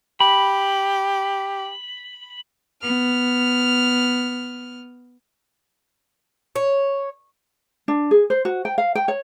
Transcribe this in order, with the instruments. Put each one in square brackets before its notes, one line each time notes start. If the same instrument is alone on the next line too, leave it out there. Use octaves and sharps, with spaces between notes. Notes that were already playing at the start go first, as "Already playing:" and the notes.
[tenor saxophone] G4 [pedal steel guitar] B5
[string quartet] B3 F6
[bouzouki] C#5
[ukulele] D4
G#4
C5
F#4
G5
F5
G5
C#5